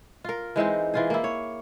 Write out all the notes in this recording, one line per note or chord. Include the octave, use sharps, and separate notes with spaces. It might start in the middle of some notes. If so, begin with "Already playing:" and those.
F4 A#4
E3 G#3 C4 D#4
E3 F4 G#4
A#3 E4
C#5